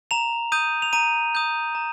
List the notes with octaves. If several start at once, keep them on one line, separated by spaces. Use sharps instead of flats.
A#5 F7
D#6 G6 D#7
F7
A#5 D#7
D#6 G6
A#5